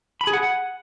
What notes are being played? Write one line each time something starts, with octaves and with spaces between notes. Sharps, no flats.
B5
G#4
F#5